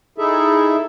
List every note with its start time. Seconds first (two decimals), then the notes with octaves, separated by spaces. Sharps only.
0.18 D#4 E4 G#4 A4 E5